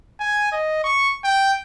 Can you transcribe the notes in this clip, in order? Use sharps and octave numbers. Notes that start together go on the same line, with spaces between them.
G#5
D#5
C#6
G5